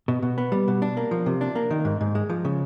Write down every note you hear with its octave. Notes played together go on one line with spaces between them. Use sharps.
B2
B2
B3
G3
B2
D4
A#3
F3
C3
D4
A#3
D#3
G#2
G#2
G#3
F3
C#3